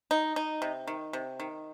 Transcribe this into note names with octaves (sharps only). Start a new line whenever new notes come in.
D#4
D#4
C3
D#3
C3
D#3